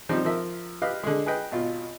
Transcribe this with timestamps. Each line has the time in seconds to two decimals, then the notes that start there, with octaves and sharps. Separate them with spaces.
0.09 F3 G3 C4 D#4
0.25 F3 A#4 E5
0.82 G4 B4 D#5 F5
1.03 D3 G#3
1.26 G#4 B4 D#5 G5
1.51 G#1 B2 F4